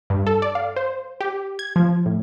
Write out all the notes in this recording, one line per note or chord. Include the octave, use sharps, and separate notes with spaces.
G2
A4
D5
F5
C5
G4
G#6
F3
A2